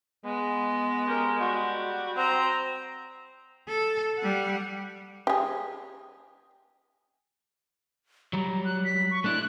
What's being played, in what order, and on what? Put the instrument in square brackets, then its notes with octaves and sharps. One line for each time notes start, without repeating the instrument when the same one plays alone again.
[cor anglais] G#3 [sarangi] B3
[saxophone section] C#4 G4 A#4
G3 F#4
[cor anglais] C4 [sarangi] A#5
[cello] A4
G3 F#5
[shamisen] G4 G#4
[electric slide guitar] F#3 G3 [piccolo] A#5
[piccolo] F#6
B6
C#6
[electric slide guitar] A3 D4 E4 [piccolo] F#6